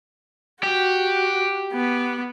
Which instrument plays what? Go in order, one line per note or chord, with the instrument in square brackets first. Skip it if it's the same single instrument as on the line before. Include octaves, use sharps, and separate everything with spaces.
[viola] F#4 [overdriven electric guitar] G4
[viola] B3